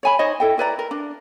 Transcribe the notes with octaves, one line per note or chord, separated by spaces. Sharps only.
C#5 G#5 B5
D#4 C5 C#5 D#5
E4 A4 G5
E4 B4 D5 A#5
A#4
D4